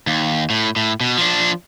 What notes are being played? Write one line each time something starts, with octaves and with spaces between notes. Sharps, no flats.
D#2
A2
A2
B2
F3 D4